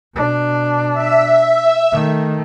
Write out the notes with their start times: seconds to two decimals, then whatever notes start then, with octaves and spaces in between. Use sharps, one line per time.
0.15 B2 D4
0.93 E5
1.92 D#3 A3